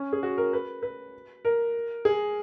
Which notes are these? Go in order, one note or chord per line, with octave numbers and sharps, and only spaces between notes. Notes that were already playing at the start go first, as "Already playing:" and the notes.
Already playing: C#4
G#4
F#4
A#4
B4
B4
A#4
G#4